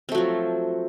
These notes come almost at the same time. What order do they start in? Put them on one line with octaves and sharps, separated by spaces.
C4 A3 F#3 F3